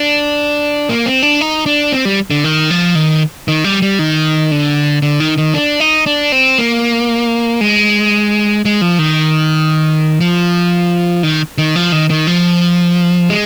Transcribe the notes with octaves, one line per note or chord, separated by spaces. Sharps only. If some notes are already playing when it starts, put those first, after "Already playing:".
Already playing: D4
A#3
C4
D4
D#4
D4
C4
G3
D3
D#3
F3
D#3
D#3
G3
G3
D#3
D3
D3
D#3
D#3
D4
D#4
D4
C4
A#3
G#3
G#3
F3
D#3
F3
D#3
D#3
F3
D#3
D#3
F3
G#3